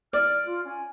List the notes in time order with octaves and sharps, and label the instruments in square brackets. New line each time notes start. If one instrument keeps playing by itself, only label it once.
[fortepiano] D5 [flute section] F6
[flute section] F4
C#4 G#5